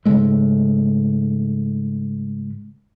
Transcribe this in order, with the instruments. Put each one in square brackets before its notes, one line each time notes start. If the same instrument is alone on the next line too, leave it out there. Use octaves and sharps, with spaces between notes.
[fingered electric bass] G#2 C#3 G#3 A3